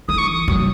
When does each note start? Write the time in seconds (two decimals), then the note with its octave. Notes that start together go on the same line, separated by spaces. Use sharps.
0.08 E3 D#6
0.18 C#6
0.28 D#6
0.48 F#3